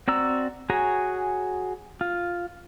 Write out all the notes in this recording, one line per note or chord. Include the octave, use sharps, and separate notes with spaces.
C4 F#4 D5 A#5 E6
F#4 G#4 C#5 G#5 A#5
F4